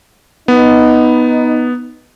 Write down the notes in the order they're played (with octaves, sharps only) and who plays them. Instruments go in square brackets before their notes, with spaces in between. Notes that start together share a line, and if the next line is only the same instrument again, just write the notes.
[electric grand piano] B3 [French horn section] D#4